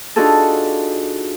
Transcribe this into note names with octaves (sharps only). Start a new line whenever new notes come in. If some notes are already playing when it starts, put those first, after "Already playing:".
D4 D#4 F4 F#4 G#4 A4